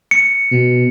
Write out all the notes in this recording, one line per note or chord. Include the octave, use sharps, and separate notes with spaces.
C#7
B2